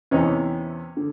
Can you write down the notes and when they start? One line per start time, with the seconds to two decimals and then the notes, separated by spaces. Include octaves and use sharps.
0.11 E2 C3 E3 C#4 D#4
0.97 D3